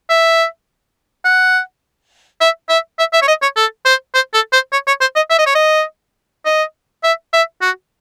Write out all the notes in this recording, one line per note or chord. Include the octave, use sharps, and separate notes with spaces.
E5
F#5
E5
E5
E5
E5
C#5
D#5
C#5
A4
C5
C5
A4
C5
C#5
C#5
C5
D#5
E5
D#5
C#5
D#5
D#5
E5
E5
F#4